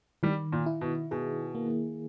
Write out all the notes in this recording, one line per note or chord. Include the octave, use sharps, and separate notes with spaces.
D#3 G3
A#2
E4
B2
B2 G#4
A#3